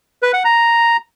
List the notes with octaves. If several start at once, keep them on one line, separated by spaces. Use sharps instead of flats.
B4
F#5
A#5